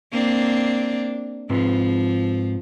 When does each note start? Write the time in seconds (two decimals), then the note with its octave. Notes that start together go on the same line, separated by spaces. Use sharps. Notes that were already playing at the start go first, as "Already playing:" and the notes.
0.12 A#3 C4 D4
1.50 G#2 F3 C4 B4